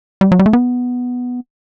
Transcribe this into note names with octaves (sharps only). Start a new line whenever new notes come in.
G3
F#3
G3
A3
B3